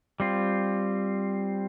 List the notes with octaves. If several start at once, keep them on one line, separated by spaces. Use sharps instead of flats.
G3 C4 F4